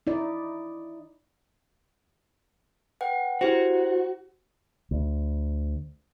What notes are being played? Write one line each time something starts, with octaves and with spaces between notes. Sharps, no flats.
D#4 E4 D5
B4 F#5 G5
E4 F#4 G4 C5
D2